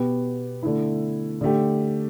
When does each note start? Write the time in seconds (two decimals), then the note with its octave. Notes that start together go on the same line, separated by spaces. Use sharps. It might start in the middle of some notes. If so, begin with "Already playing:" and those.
Already playing: B2 B3 G4
0.63 D3 A3 E4
1.41 D3 A3 G4